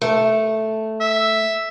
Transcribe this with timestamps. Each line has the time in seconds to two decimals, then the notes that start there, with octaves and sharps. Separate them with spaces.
0.02 A3
1.01 E5